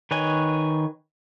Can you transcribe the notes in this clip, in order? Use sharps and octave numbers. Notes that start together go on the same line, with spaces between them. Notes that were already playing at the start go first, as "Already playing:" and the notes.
D#3 B4 C#5 D#5 G#5